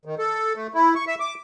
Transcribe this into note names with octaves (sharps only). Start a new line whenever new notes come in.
D#3
A4
A3
E4
C#6
E5
D6